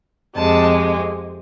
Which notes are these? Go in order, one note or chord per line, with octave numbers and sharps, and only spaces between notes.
F2 C3 G#3 A5